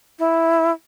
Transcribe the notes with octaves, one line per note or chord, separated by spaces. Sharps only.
E4